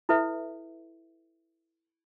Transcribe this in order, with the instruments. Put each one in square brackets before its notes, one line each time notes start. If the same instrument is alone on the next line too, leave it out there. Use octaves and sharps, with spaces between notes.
[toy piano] E4 A4 B4 E5